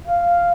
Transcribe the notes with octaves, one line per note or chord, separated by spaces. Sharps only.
F5